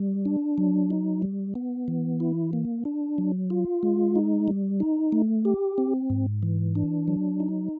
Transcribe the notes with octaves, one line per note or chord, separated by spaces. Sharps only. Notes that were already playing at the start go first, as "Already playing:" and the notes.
Already playing: G3
D4
F#3
D#4
G3
B3
E3
E4
A#3
D4
F#3
F4
G#3
D#4
G3
D#4
A3
G4
C4
G#2
E3
D4
F#3
D#4